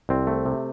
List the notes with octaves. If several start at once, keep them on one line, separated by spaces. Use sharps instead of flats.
C2 C4
A3
C3